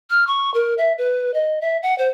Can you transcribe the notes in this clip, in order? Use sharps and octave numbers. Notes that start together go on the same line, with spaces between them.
F6
C#6
A#4
E5
B4
D#5
E5
F#5
C5